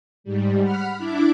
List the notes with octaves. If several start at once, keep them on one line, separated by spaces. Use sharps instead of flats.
G#2 G3
F#5 B5 F6
D4 E4 D6